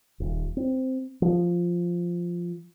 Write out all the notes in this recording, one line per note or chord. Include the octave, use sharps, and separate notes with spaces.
D#1
C4
F3